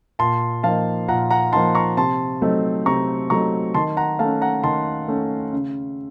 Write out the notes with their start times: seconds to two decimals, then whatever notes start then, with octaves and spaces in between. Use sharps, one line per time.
0.19 A#2 A5 C6
0.63 F3 A#3 D#4 F5 A5
1.08 A#2 F#5 A#5
1.30 F#5 A#5
1.52 F3 A#3 D#4 A5 C6
1.75 A#5 C#6
1.97 C3 A5 C6
2.42 F#3 A3 C4 D#4
2.86 C3 A#5 C#6
3.30 F#3 A3 C4 D#4 A#5 C#6
3.74 D#3 A5 C6
3.97 F#5 A#5
4.19 A3 F5 A5
4.24 C#4
4.41 F#5 A#5
4.64 D#3 A5 C6
5.08 A3 C#4
5.53 C#3